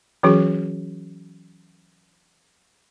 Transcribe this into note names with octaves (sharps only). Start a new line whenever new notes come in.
E3 F#3 C#4 F#4 G#4